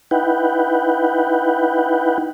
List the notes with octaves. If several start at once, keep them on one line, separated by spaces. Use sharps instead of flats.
D#4 E4 B4 F#5 G5